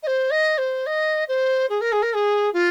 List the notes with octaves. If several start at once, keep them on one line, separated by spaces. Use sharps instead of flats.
D#5
C5
D#5
C5
D#5
C5
G#4
A#4
G#4
A#4
G#4
F4